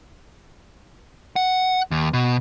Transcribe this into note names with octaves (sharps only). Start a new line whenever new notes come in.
F#5
D#2
B2